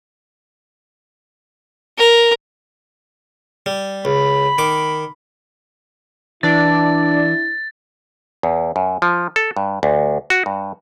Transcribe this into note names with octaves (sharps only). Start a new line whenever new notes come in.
A#4
G3
C#2 B5
D#3 D6
E3 D4 E4 D5 A6
E2
F#2
F3
A4
G2
D2
F#4
G2